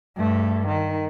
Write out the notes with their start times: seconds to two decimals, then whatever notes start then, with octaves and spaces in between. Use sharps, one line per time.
0.16 G2 A3
0.67 D#3